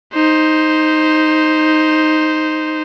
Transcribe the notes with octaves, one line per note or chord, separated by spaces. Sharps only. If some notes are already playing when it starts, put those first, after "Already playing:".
D#4 C5